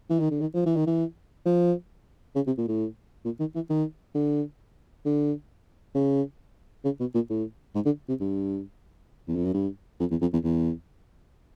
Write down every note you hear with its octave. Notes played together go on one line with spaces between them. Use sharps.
E3
D#3
D3
D#3
F3
E3
D#3
E3
F3
C#3
C3
A#2
A2
A#2
D#3
E3
D#3
D3
D3
C#3
C#3
B2
A#2
A2
G#2
D3
C3
G2
E2
F2
F#2
G2
F2
E2
F2
E2
E2